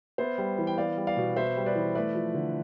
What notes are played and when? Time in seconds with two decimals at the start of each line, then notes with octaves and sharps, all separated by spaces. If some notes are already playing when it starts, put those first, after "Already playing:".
0.18 B3 C5 E5
0.38 G3
0.58 E3
0.67 G5
0.78 B3 D5 F5
0.97 G3
1.07 D5 F5
1.17 B2
1.36 B3 C5 E5
1.57 G3
1.66 B4 D5
1.75 E3
1.95 A3 B4 D5
2.15 F3
2.34 D3